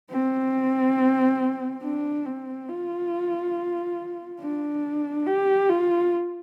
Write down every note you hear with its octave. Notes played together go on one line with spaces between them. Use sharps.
C4
D4
C4
F4
D4
G4
F4